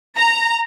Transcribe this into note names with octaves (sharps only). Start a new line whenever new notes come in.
A#5